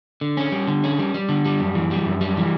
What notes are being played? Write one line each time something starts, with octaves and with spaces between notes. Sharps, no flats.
D3
C#4
G3
D3
C#4
G3
G3
D3
G3
F#2
E3
G3
F#2
G3
E3